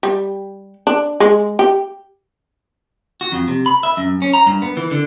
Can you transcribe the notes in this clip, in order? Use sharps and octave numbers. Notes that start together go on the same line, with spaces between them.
G3
D4
G#3
G4
F#4
F2
C3
B5
E5
F#2
C#4
A#5
G2
B3
E3
D3